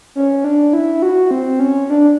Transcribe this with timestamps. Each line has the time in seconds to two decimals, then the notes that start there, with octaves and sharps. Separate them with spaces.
0.16 C#4
0.44 D4
0.73 E4
1.02 F#4
1.31 C4
1.59 C#4
1.90 D4